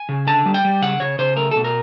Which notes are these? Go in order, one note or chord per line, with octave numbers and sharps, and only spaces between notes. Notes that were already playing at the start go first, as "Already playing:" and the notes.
Already playing: G#5
C#3
D3 A5
G3
G5
G3
C#3 F#5
C#3 C#5
C#3 C5
A3 A#4
B2 A4
A#4